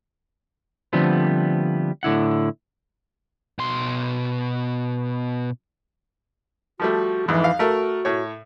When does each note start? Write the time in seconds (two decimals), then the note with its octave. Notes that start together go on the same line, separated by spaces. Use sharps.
0.93 D3 F3 G3 A3 B3 C4
2.03 A2 D3 E4 F#5
3.59 B2 C6
6.80 F3 G3 A3 F#4
7.28 F2 G#2 E3
7.44 F5
7.59 A3 F#4 A#4
8.05 A2 C#5